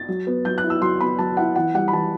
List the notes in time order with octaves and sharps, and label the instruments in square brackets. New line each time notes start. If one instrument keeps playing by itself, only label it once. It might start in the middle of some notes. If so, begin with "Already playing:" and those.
Already playing: [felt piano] A6
F#3
B3
F#3 G6
F#6
E4
E6
F#3 C6
B3 B5
F#3 A5
E4 F#5
E3 F#5
G3 F#5
B5
E3 A5